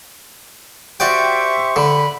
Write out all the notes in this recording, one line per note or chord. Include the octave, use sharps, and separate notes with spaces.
F#4 G4 C5 D5 E5 G5 C#6
D3 B5